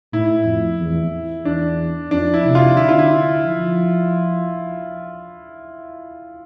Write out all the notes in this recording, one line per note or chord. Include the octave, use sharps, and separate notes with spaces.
A2 E4
F2
E2
E2 D4
F2 D4
E4
C3
F4
D3 E4
F4
E4
F3